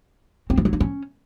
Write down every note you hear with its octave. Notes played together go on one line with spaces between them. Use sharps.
C4
F3
F#3
D#4
C#4